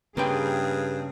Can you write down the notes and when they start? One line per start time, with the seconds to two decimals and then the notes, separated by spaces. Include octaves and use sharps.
0.17 G2 C#3 A#3 G#4 B4 G5